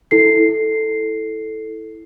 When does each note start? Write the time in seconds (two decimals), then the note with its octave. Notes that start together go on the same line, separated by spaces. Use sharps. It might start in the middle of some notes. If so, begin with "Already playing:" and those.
0.11 E4 A4 C7